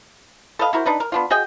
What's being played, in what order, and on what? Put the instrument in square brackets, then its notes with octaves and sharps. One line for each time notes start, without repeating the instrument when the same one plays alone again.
[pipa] A4 B4 D#5 F5
E4 F#4 A#4 C5
D4 D#4 B4
A#4
B3 D4 F4
F#4 G#4 D#5 G5